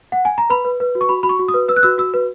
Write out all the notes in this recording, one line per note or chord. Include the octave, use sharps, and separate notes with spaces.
F#5
G#5
A#5
B4 B5
B4
B4
F#4
C#6
F#4 B5
F#4 B5
C#6
F#4
D#6
B4
B4 E6
F#6
F#4 E6
F#4 E6
B4